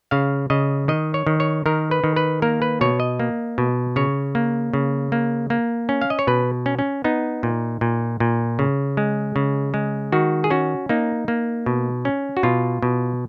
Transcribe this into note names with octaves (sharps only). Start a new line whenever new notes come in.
C#3 F5
C#3 D#5
D#3 D#5
C#5
D#3
C#5
D#3 A#4
B4
D#3
B4
A#3 A#4
B4
B2 C#5
D#5
A#3
B2
C#3 C#5
A#3
C#3
A#3
A#3
C#4
F5
D#5
C#5
B2 B4
C#4
C#4
B3 D#4
A#2
A#2
A#2
C#3
G#3
C#3
G#3
D#3 F#4
G#4
C#4 F#4
A#3 D#4
A#3
B2
C#4
F#4
B2 F4
B2